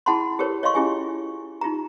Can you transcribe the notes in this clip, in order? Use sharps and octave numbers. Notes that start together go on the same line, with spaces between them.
E4 G#4 F#5 A5 B5 C6
G4 A4 A#4 C5 C#5
C#5 D#5 F5 C6 C#6
C#4 E4 F4 G4 G#4 G#5
D#4 F4 G4 A#5